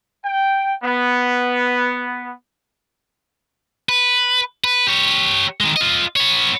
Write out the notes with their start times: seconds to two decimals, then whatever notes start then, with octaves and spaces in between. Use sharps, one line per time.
0.24 G5
0.83 B3
3.89 B4
4.64 B4
4.87 G4 C#5
5.61 D#3 G#3
5.77 F4 D#5
6.16 B3 C#5